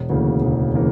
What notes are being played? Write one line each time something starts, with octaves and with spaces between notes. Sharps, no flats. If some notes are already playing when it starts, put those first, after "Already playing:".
Already playing: E1
D2 C#3 E3 A#3
E1
C#3 E3 A#3